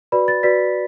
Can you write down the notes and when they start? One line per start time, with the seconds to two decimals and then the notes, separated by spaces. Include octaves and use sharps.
0.12 F#4 B4 D5 B5
0.28 A6
0.43 F#4 B4 D5 B6